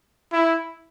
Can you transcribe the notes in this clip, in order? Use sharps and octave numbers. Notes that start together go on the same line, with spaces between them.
E4